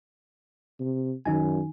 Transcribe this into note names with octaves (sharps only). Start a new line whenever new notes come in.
C3
F#2 D#3 D#4 G#5